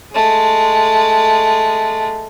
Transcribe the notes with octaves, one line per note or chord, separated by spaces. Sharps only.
G#3 A3